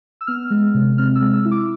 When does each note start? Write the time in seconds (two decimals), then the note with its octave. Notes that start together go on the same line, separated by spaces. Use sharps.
0.21 E6
0.27 B3 F6
0.50 G#3
0.75 C3
0.98 C4 F6
1.15 E6
1.21 G#3
1.33 E6
1.45 E4
1.51 D6